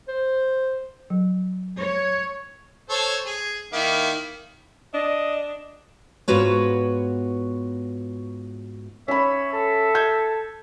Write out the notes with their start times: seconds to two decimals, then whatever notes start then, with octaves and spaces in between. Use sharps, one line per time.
0.08 C5
1.10 F#3
1.79 C#5
2.90 A4 C5 C#5
3.26 G#4
3.73 D#3 A#3 E4
4.94 D4 D#5
6.28 G#2 B3 F4 F#4 B4 C#5
9.08 C#4 C#5 E5 B5
9.53 A4
9.95 G6 G#6